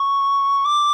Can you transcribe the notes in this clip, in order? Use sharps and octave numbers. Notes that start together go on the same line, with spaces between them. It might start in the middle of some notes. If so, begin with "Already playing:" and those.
Already playing: C#6
D6